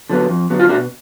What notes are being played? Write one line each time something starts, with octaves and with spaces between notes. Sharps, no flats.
D3 F#3 B3
F2
D3 F#3 B3
F4
B2 D4 F#4